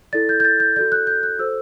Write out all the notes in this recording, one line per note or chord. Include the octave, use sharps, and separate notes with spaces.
E4 A4 D5 A6
G6
G6
A6
G6
F#4 A4 D5 G6
F#6
G6
F#6
F#4 A4 C5 E6